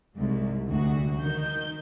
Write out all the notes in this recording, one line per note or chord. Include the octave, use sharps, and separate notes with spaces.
C2 G#2
D2 F#4
D#3 G6